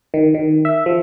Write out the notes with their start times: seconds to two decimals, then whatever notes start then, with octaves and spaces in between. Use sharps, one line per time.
0.14 D#3
0.34 D#3
0.65 E5
0.86 F3